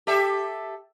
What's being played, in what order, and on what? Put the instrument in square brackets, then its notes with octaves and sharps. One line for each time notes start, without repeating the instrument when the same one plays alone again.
[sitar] G4 A4 E5